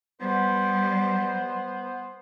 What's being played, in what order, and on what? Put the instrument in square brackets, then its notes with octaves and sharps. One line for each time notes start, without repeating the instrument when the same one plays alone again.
[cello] G3 [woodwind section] B3 C5